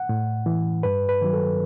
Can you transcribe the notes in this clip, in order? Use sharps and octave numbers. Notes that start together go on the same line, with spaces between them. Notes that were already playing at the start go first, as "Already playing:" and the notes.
Already playing: F#5
A2
E3
G2 B4
B4
D#3 F#3
A4